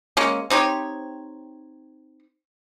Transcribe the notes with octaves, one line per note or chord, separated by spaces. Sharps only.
G#3 A#3 C#4
C4 D#4 G4 C#5